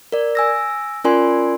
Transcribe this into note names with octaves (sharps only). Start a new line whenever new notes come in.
A#4 D5
G#5 E6 A#6
C#4 F4 A#4 D5 G#5 C6